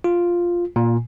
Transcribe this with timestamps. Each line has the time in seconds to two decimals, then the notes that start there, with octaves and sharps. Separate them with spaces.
0.04 F4
0.76 A#2